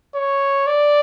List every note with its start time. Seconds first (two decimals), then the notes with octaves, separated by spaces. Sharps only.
0.15 C#5
0.67 D5